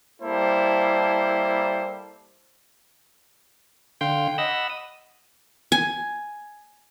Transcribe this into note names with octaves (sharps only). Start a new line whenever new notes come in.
G3 A#3 E4 A4 C5 A5
D3 F5 G5 C6
D#5 F#5 B5 E6
D#6
G#5